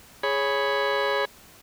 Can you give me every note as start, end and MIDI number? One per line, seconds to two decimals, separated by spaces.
0.23 1.25 68
0.23 1.25 73
0.23 1.25 83